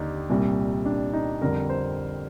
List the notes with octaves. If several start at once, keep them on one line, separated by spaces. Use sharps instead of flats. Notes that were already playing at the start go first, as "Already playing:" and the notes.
Already playing: D#2 D3 D#4 G4
C2 A#2 G3
D4
D#4
F2 D3 G3 A#4
C5